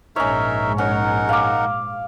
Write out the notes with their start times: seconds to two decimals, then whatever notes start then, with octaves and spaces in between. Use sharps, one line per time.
0.16 A#1 G#2 C#4 D#4 A#4 C#5 E5
0.78 C#4 D#4 A#4 F#5
1.29 F5 D6